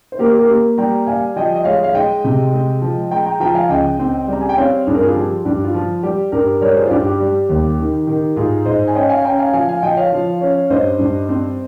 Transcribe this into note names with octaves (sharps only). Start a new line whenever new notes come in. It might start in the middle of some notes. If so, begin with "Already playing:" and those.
C5
A#3 G4 A#4
G4 A#4
A#3
G3 G5 A#5
G3 F5 G#5
F3 D#5 G5
D#5
G#3 C#5 F5
F5
G#3 D#5 G5
C3
G#3
F3
G#3 G5 A#5
G5 A#5
F3 G5 A#5
F5 G#5
C#2 D#5 G5
C4
G3 A#5
G#5
G5
C4 C#5 F5
G2 G#4
A#4
F4 G#4
F3 G4
G2 G4
F4
F3
G3 G4
G2 G4 A#4
G3 A#4 C#5
G#4 C5
F4
G2 G4
G4
G3
D#2
D#3
D#3
G#2 F4 G#4
G#2 C5 D#5
G#5
C#4 D#5 G5
F5 G#5
C#4 G5 A#5
F5 G#5
F3 F5 G#5
F5 G#5
F3 D#5 G5
C#5 F5
F3
C#4
G2 C5 D#5
G2
C4